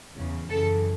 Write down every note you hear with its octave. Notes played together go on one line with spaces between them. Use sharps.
E2 C#3 E3
F#2 C#3 E3 A4